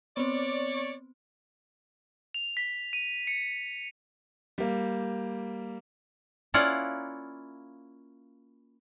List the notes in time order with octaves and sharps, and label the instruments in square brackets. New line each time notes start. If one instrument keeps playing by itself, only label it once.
[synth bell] B3 C4 [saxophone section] C#5 D5
[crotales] F7
B6
D#7
C#7
[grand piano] G3 A#3
[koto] A#3 C#4 E4 F4 D5 F#5